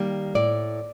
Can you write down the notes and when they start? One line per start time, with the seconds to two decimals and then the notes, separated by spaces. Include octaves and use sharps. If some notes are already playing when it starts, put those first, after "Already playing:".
Already playing: D#3 G3 A#3
0.35 A2 D5